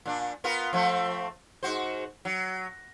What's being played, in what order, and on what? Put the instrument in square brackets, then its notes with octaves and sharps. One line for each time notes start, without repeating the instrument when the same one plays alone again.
[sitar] A#2 D4
B3 F4 A#4
F3 A3 C4
G#2 F#4 C5
F#3